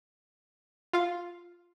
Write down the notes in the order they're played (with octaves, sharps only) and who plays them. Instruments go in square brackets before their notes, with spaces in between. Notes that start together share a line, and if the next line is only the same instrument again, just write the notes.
[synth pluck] F4 F5